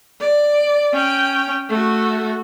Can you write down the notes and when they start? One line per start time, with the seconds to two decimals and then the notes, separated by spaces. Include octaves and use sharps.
0.20 D5
0.93 C#4 G5
1.69 A3 F#4